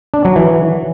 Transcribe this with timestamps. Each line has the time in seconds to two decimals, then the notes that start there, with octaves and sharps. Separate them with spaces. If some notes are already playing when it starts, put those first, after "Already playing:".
0.14 D4
0.25 F#3
0.36 E3